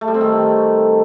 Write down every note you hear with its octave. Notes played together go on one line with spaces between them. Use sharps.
A3
G3
C4
D#3